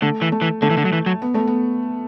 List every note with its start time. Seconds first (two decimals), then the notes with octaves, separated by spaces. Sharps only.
0.02 D3 A3
0.22 E3
0.32 A3
0.42 E3
0.62 D3 A3
0.70 E3
0.77 D3
0.85 F#3
0.93 E3
1.06 F#3
1.22 B3
1.34 A3
1.47 B3